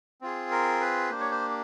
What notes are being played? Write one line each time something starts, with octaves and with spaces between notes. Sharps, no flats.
C4 F4 G#4
A#4
B4
A#3 D4 G4 C5
C#5
C5